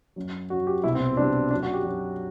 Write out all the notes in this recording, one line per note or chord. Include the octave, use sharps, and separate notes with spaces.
F#2 F#3
F#2 F#3 F#4
G4
C2 B2 G3 E4
C4
C2 B2 G3 D4
F#2 F#3 D4
F#4
G4
F#2 F#3